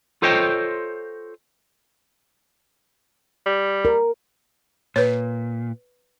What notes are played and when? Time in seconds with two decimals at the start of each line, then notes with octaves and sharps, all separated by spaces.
0.22 F4 A4 C5 C#5 D#5 G5
3.46 G3
3.85 A#4
4.96 A#2 B4 C#5